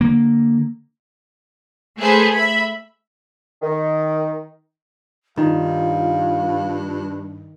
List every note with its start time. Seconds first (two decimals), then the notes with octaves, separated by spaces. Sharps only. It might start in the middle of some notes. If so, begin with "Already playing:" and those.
0.01 D3 A#3
1.99 A3 G#4 A4 B4 C5
2.34 E5 B5
3.62 D#3
5.37 G2 D#3 F4 F5